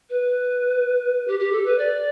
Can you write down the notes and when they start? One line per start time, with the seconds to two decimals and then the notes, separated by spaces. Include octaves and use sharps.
0.10 B4
1.28 G4
1.40 G4
1.52 A4
1.65 B4
1.78 D5